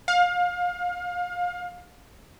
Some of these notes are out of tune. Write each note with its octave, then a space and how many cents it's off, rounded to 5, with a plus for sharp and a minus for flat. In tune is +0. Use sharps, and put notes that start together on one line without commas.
F5 +30